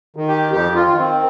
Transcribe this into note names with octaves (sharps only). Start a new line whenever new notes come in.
D#3
G4
F2 G4
F4
D#3
C4